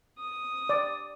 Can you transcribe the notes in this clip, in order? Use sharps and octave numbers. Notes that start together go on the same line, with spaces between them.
D#6
D5